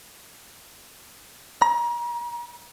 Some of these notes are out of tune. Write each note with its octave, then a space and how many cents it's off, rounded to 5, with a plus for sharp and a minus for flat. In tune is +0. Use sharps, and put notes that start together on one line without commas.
A#5 +35